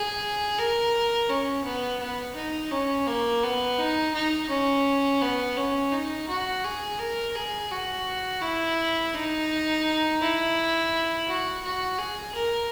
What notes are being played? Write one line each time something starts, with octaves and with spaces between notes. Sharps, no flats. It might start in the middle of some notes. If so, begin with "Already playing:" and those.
Already playing: G#4
A#4
C#4
B3
B3
D#4
C#4
A#3
B3
D#4
D#4
C#4
B3
C#4
D#4
F#4
G#4
A#4
G#4
F#4
E4
D#4
E4
F#4
F#4
G#4
A#4